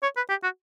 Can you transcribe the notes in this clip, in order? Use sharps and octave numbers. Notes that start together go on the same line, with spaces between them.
C#5
B4
G4
F#4